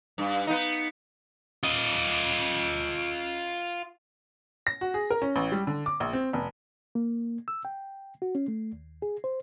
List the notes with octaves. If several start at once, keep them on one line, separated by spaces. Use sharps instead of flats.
G2
B3 D#4
F4 D#5
A#6
F#4
G#4
A#4
C#4
A1
G3
D3
D6
A#1
C4
F1
A#3
E6
G5
F#4
C#4
A3
D#2
G#4
C5